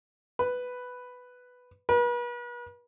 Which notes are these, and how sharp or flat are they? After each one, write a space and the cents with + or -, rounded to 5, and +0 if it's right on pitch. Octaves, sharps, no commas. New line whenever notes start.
B4 +5
B4 -40